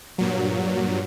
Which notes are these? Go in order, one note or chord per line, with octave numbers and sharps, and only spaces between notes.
G2 A#2 F#3